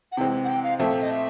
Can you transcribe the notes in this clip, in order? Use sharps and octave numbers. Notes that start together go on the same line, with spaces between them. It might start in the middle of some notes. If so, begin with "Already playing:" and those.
F#5
C3 E3 G#3 C4 G5
F#5
G5
F5
A#2 F3 A3 C4 E5
D#5
E5